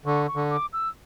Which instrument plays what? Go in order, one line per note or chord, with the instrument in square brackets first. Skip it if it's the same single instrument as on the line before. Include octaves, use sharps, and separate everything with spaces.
[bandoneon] D3 [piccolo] C#6
[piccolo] C#6
[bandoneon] D3
[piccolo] D6
E6